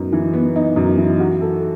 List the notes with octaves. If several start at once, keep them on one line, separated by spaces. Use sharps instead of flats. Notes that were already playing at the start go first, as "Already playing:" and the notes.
Already playing: F#2 B3 D#4
E3
B3
D#4
F#2
E3
F#4
A4